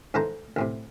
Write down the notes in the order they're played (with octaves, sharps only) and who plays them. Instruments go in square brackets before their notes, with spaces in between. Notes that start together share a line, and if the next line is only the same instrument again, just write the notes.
[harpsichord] G#2 D3 E3 A4 C5 A#5
D2 A2 C3